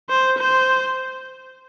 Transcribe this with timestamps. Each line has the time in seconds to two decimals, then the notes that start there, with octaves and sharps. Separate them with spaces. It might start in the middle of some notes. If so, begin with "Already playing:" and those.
0.10 C5
0.39 C5